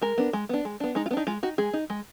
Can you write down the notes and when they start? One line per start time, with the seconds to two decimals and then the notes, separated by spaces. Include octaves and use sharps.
0.02 G#3 A#4
0.18 B3 D4
0.33 G#3
0.49 B3 D4
0.65 G#3
0.80 B3 D4
0.95 G#3 D#4
1.06 F4
1.11 B3
1.13 D4 D#4
1.27 G#3 F4
1.43 D#4 F#4
1.58 G#3 G#4
1.73 D#4
1.90 G#3